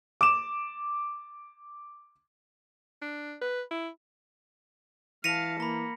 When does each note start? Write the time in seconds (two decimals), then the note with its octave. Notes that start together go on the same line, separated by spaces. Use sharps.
0.21 D6 E7
3.02 D4
3.41 B4
3.71 E4
5.24 E3 F5 A5 A#6 B6 C#7 D#7 F7
5.60 A#3 A#5 B5